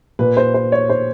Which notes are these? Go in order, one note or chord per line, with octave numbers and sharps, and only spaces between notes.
A#2 B4
C5
C5
C#5
C5